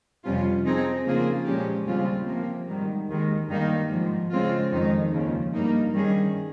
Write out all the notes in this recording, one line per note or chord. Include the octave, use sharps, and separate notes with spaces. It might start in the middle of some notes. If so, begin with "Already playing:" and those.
F2 C3 G3 C#4 F4
F3 C4 D#4 G#4
C#3 F3 A#3 F4 G#4
A#2 F3 G#3 C#4 G4
D#2 C#3 G3 C4 F4
C3 F3 A#3
G#2 D#3 G3
D#2 D#3 G#3
G2 D#3 G3 A#3 D#4
G#2 F3 G#3
C#3 G#3 C4 F4
F2 D#3 G#3 D#4
D#2 C#3 F3
G2 G3 A#3 D#4
G2 D#3 G3 C#4 G#4